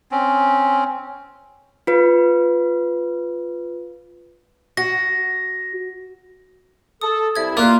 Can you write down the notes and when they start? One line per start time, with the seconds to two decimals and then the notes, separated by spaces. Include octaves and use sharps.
0.11 C4 C#4
1.87 F4 B4
4.77 F#4 A#6
7.01 A4 D#6
7.36 C2 E4 E5 G#6
7.57 A#3 F4 D5 F#6